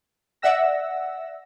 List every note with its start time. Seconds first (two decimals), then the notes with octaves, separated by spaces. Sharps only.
0.42 D5 E5 F#5 E6 A#6